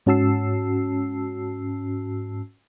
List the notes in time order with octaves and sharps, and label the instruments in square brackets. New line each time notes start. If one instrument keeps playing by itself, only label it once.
[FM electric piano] G#2 C#4 F#4 A5 E6 C7